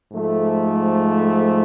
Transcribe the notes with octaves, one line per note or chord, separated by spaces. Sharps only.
G#2 F3 A3